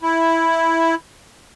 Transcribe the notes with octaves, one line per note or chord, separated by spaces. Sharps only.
E4